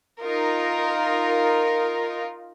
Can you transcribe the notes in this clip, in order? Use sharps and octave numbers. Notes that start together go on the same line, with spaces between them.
D#4 F4 A#4